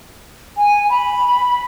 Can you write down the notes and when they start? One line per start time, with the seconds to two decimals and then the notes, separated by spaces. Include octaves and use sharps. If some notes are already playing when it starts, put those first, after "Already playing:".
0.57 G#5
0.90 B5